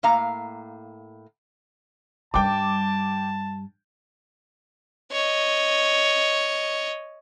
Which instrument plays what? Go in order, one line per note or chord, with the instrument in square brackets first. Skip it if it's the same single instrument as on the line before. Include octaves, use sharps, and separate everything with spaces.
[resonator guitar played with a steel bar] A2 A#3 F5 A#5
[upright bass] G2 G3 [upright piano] G5 D6 [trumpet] A5
[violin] C#5 D#5